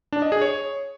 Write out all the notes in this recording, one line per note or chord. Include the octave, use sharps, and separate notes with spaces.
D4
D#5
G#4
C#5